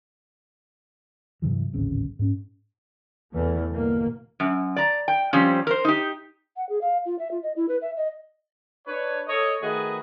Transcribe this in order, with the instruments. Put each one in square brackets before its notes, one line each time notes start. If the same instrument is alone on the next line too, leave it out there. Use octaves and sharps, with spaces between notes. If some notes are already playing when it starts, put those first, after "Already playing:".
[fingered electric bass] G2 C3 E3 F#3
D1 G#1 C#3 C4
G#2 C#4
[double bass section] E2 B2 E3 A3
G1 B2 A#3
[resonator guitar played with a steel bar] F#2
D5 A#5
G5
F3 G3 C4 C#4
A#4 C5
D#4 G4
[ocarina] F#5
G#4
F5
F4
E5
F4
D#5
E4
B4
E5
D#5
[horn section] D4 B4 C#5
A4 C#5 D#5
D#3 A3 F#4 G#4 B4 D#5